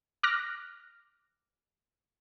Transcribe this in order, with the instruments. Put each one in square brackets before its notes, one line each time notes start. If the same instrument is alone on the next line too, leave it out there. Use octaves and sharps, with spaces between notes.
[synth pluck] D6 F6 F#6 A#6